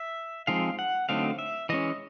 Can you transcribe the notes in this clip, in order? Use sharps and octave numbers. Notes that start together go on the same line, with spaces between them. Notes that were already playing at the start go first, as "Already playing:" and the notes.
Already playing: E5
F3 G#3 C4 D#4 F5
F#5
D3 F#3 A3 C4 D#4 F5
E5
E3 G#3 C#4 D#5